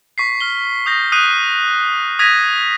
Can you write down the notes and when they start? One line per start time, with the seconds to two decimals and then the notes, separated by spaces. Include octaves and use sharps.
0.18 C#6 B6 C7
0.41 F6 G7
0.86 D#6 G6 A#6
1.12 D#6 F#6 C7 D#7
2.19 D#6 G#6 A#6 B6 D#7